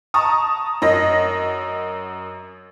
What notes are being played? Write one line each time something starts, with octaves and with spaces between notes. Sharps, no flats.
A5 A#5 C#6 D#6
F#2 D#5 A#6